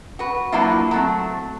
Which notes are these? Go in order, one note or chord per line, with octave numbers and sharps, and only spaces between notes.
F#4 B4
F#3 A#3 D4 E4 F4
F#3 A3 C4